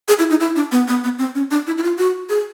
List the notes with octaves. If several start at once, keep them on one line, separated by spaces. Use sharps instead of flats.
G#4
E4
D#4
E4
D4
B3
B3
B3
C4
C#4
D4
E4
E4
F4
F#4
G#4